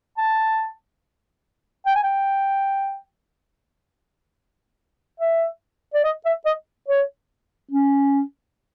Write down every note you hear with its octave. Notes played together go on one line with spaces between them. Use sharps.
A5
G5
G#5
G5
E5
D5
D#5
E5
D#5
C#5
C#4